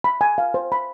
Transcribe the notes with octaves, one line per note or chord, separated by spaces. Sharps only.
B5
G#5
F5
C5
B5